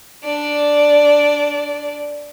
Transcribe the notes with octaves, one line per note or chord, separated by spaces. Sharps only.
D4 D5